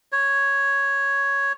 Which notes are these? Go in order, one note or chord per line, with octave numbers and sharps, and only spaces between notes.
C#5